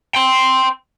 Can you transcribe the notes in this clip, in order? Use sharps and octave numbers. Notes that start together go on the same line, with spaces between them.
G5 C6